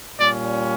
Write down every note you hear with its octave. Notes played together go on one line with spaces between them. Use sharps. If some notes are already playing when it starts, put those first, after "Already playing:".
A#2 G3 C#4 D5